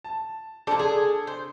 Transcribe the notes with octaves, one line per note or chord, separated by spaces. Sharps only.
A5
F3 A#3 D4 A4 D5
G#4
C5